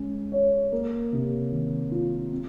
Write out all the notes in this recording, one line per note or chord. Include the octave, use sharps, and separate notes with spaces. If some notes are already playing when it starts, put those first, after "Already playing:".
Already playing: G#3 C#4
C#5
A#3
C3
D#3
F4
C4